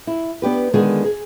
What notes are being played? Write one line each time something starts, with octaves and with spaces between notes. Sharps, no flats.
E4
B3 D4 G4 B4
D3 D#3 G#3 B3 F4 G#4
G#4